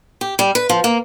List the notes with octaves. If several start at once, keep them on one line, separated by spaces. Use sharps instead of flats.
G4
G3
B4
F3
A#3